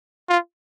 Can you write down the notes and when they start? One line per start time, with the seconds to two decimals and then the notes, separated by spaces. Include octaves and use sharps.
0.29 F4